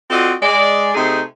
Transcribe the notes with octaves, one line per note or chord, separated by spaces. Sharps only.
C4 F4 F#4 A4 D5 D#5
G#3 D5
C3 A3 D#4 G#4 C5